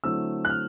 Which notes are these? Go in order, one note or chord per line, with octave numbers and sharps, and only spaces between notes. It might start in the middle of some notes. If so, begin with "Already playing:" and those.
D3 F#3 A3 C4 E4 E6
F#6
F6